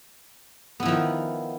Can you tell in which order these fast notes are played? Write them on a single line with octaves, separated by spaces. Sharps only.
B3 E4 F3 D#3